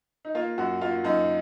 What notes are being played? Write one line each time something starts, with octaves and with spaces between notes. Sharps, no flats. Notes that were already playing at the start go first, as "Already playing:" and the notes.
D#4
A#3 F4
F#2 F#4
A#3 F4
F#2 D#4